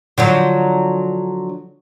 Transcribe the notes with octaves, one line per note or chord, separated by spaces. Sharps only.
D3 F3 F#3